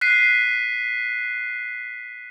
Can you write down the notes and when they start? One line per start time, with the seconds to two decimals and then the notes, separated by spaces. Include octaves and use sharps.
0.01 F#6 B6 C7 D#7